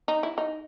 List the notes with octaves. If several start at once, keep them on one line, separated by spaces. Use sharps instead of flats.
D#4
E4
D#4